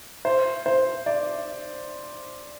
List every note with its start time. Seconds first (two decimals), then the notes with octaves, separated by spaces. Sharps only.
0.25 C5
0.66 C5
1.06 D5